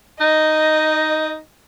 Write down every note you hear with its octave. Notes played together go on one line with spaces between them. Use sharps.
D#4 D#5